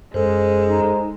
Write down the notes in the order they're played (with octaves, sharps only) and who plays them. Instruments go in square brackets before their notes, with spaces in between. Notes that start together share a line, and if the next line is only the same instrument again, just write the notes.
[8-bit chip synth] F#2 A4 [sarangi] G#3 [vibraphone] C5
[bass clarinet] D#4